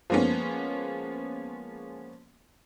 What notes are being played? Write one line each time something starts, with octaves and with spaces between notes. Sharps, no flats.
F3 G#3 A#3 B3 C#4